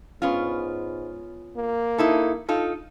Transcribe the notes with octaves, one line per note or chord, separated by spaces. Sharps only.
G#2 B3 C#4 F4
A#3
D#4 E4 A4
D#4 F4 A4